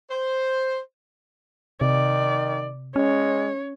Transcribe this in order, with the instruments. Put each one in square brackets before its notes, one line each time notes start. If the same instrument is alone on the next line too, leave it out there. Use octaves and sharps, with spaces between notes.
[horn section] C5
[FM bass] C3 [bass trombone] D#3 [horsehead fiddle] D5
[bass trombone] G#3 [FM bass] C#4 [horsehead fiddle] C#5